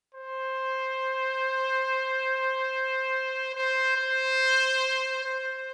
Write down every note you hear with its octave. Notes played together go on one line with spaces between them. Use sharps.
C5
C5
C5
C5